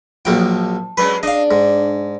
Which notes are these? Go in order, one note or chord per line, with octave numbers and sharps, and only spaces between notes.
A#1 F3 F#3 G5
F#3 G#3 C#4 B4
D4 D#5 F5
G#2